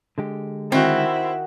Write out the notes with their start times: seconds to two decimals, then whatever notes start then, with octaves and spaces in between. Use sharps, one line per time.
0.18 D3 G#3 G4
0.72 D#3 C4 E4 F#4